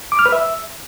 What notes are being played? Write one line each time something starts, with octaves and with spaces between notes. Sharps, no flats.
D6
F6
B4
E5